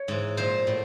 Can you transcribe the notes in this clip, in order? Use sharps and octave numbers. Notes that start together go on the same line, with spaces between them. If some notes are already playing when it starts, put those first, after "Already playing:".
Already playing: C#5
G#2 E3
A#2 F3 C5
A2